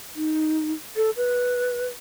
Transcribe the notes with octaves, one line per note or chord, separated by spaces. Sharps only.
D#4
A4
B4